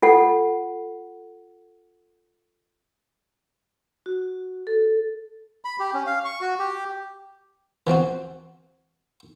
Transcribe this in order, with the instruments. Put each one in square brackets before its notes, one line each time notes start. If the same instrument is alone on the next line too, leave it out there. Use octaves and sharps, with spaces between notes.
[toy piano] F4 A4 F#5
[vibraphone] F#4
A4
[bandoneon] B5
G4
C#4
F5
C#6
F#4
G4
[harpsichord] E3 F3 C4 F#4